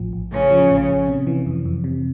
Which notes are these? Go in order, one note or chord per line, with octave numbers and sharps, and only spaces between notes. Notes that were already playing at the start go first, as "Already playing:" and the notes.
Already playing: A1 A2 F3
A1
A2 C#3 C#4
F3
A1
A1
C3
E3
F2
F2
C3